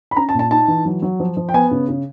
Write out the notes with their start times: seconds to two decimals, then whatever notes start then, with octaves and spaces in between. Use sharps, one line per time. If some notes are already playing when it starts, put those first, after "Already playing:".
0.11 B5
0.17 C#4 A#5
0.29 A5
0.34 A#2
0.39 A5
0.51 D#4 A5
0.68 E3
0.85 F#3
1.02 F#3
1.20 F3
1.37 F3
1.49 G5
1.54 B3 G#5
1.71 C#3
1.89 C#3